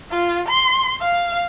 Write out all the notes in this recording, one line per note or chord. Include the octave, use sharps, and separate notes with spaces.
F4
C6
F5